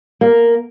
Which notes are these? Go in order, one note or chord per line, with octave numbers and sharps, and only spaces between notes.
A#3